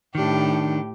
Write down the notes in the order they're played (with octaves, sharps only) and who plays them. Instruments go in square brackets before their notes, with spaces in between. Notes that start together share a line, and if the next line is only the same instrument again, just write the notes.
[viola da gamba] A2 G4 [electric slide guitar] D#3 D4